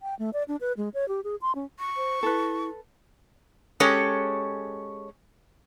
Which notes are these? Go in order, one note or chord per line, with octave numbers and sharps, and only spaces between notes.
G5
A3
D5
D4
B4
G#3
C#5
G4
G#4
C6
C#4
C#6
C5
E4 A4 B4
G#3 C#4 G4 A4 C#5